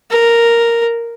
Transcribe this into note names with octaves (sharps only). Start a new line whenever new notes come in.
A#4